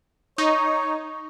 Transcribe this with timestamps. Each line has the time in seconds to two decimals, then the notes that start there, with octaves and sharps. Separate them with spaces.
0.38 D#4 C#5